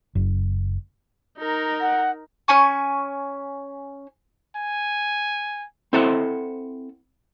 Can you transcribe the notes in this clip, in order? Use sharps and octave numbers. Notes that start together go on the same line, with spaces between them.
F#1
D#4 A#4
F#5
C#4 G#5 C#6
G#5
C4 E4 A4 C5 F#5